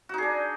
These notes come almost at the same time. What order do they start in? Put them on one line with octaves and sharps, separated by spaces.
F#4 D#4 G#4 D4